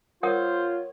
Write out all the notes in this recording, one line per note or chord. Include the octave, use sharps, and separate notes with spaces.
F4 A#4 C5 C#5 F#5 D#6